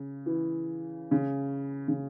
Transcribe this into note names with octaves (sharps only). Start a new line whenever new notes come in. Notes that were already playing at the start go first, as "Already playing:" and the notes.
Already playing: C#3
E3
C#3
C#3